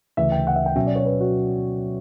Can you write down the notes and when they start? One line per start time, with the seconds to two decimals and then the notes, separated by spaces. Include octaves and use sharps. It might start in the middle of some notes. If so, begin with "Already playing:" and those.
0.17 D2 C#3 E3 E5
0.32 G5
0.47 F#5
0.56 E5
0.66 G5
0.75 B2 F#3 C#4 E5
0.86 D5
0.96 C#5
1.05 B4
1.21 F#4